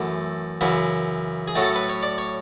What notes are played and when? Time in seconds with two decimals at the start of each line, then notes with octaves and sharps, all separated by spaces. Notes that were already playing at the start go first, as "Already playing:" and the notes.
Already playing: F#2 E3 A3
0.61 F#2 C#3 E3 E5
1.48 G#4
1.55 A2 F#3 A3
1.62 A4
1.75 B4
1.89 C#5
2.03 D5
2.18 C#5